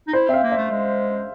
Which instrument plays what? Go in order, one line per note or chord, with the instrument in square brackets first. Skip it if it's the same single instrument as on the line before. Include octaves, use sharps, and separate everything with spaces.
[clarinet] D#4
[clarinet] E4 [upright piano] C5
[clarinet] C4 [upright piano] E5 F5
[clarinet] A#3
[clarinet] A3 [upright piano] E5
[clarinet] G#3